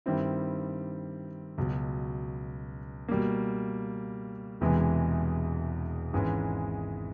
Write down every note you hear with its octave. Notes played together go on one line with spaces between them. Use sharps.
G2 D#3 G3 C4 E4
C#2 B2 F#3
B2 G3 A#3
E1 E2 C3 E3 G#3
G#1 G#2 E3 G#3 C#4